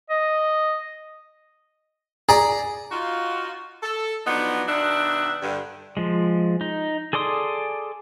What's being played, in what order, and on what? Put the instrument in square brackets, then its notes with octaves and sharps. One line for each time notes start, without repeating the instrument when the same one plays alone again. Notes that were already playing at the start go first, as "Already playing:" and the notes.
[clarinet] D#5
[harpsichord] G#4 D5 [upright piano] A#5
[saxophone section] D#4 F4 F#4
A4
F3 F#3 B3 D4 D#4
B2 D#3 D4 D#5 E5 F#5
G2 D3
[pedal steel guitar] F3 G#3
D#4
G#4 A4 D5 C6 D#6